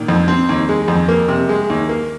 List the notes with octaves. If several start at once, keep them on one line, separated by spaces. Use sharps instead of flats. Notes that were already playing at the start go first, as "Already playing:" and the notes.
Already playing: A#2 D#3
F2
C4
D#2
G#3
F2
A#3
C3
G#3
D#2
A#3